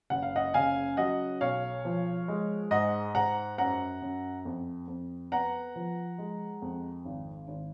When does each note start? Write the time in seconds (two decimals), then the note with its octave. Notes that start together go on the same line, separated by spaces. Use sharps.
0.10 F#1 F#5
0.23 F5
0.36 D#5 F#5
0.54 C#3 F5 G#5
0.97 F#3 D#5 F#5
1.41 B1 C#5 F5
1.85 F3
2.28 G#3
2.71 G#2 D#5 F#5
3.15 G#2 F#5 A#5
3.58 F#2 F#5 A#5
4.02 F#2
4.45 F2
4.88 F2
5.32 B3 F#5 A#5
5.76 F3
6.18 G#3
6.62 F2
7.05 G#1
7.48 G#1